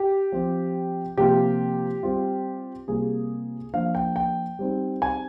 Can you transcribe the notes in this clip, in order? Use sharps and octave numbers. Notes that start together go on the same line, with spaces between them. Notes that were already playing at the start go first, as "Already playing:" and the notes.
Already playing: G4
F3 C4 F4
C3 F3 A#3 F4 G4
G3 C4 F4
C3 G3 A#3 F4 G#4
F3 A#3 D4 F5
G5
G5
G3 C4 D#4
G#5